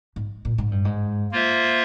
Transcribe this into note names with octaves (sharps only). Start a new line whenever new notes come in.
G#2
A#2
G#2
G2
G#2
A#3 F4 C5 E5